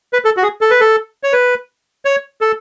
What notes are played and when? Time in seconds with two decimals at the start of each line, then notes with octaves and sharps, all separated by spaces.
0.13 B4
0.25 A4
0.37 F#4
0.43 G#4
0.61 A4
0.71 B4
0.80 A4
1.23 C#5
1.33 B4
2.05 C#5
2.41 A4